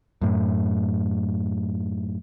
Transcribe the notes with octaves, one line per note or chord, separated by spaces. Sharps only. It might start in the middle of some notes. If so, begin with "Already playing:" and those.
F#2 A2